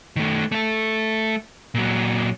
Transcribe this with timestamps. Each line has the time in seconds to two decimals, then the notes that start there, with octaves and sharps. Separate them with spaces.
0.16 D#3 A3
0.52 A3 A4
1.75 A#2 F#3